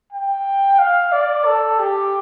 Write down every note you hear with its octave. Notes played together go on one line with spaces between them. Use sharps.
G5
F5
D5
A4
G4